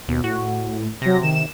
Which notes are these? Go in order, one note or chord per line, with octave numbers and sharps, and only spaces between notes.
D#2 B2
A2 F#4
C3 F#3 A#6
D#3 E7